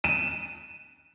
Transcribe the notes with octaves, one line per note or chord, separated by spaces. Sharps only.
D#7 E7